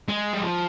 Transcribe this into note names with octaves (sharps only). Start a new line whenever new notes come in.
G#3
G3
F3